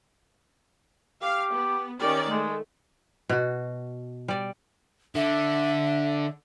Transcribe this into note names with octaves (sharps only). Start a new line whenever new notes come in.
G4 F5
B3
D#3 C#4 G4 D5
G#3 A3
B2 F#4
G3 D5
D3 E5